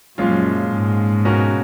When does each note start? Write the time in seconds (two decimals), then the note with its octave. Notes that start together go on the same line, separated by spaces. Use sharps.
0.18 F#2 A#2 F3 G#3 C#4 F4
0.72 G#2
1.25 B2 A#3 C#4 F#4 A#4